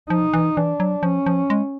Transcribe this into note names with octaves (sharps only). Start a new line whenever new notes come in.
F3 D#4
E3
E3 D4
F#3
F3 C#4
F3
G#3